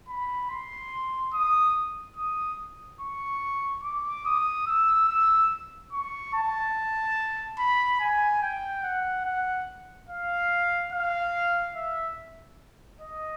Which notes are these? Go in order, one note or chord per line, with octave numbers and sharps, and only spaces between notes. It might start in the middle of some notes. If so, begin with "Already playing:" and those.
B5
C6
D#6
D#6
C#6
D6
D#6
E6
E6
C#6
A5
B5
G#5
G5
F#5
F#5
F5
F5
E5
D#5